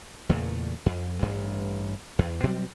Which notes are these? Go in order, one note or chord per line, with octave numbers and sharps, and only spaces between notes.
E2 A#2 C#3 A3
F2
A1 G2
E2
B2 F#3 G3 C4